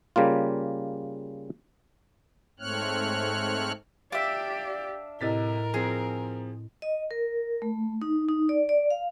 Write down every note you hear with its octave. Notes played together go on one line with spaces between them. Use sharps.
C#3 G3 A#3 F4
G#2 A3 C4 C#5 F6 F#6
D4 G4 D5 E5 F5
A2 C3 E4 A#4 D#5 A6 B6
F3 C4 G#4
D#5
A#4
A3
D#4
D#4
D5
D5
F5